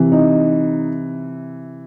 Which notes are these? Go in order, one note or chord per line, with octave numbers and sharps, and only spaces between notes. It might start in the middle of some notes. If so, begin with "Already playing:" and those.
Already playing: C3 E3
D#4